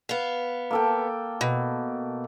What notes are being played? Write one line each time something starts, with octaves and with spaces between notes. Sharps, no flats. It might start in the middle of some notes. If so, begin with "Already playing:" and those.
B3 F5
A#3 A4 G5
B2